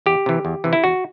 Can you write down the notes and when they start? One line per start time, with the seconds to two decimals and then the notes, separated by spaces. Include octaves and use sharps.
0.06 E2 G4
0.26 C3 E3
0.45 E2
0.64 C3 E3
0.73 E4
0.84 E2 F#4